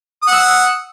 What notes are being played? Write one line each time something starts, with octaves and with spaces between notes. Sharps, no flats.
F#5 D#6 E6